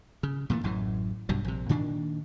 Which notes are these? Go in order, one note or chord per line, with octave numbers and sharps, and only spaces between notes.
C#3
A#2 E3 G#3 A3
A1 F#2 A2 E3
B1 G2 C3 F#3
A#1 C3
A#2 D#3 D4